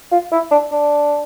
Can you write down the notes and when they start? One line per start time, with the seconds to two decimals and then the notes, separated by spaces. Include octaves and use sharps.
0.12 F4
0.32 E4
0.51 D4
0.72 D4